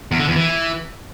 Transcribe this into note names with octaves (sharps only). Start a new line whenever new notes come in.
E2
D3
E2
E3